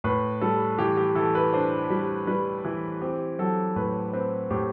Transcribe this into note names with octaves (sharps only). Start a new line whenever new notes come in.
A2 B4
G3 A4
E3 G4
G4
E3 A4
B4
D4 C5
G3
G3 B4
E3
C4 G4
F#3 A4
A2 B4
C4 B4
A2 G4